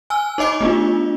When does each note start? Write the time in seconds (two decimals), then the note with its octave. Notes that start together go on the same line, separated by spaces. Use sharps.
0.10 G#5 E6 F6
0.38 D#4 C#5 D#5 D6
0.61 A3 B3 D4 F4